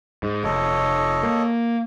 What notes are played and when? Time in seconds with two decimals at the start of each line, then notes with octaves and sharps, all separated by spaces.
0.23 G#2
0.44 F1 A4 C#5 D#5
1.23 A#3